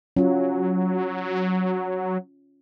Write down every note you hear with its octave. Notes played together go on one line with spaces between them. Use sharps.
F#3 C#4 F4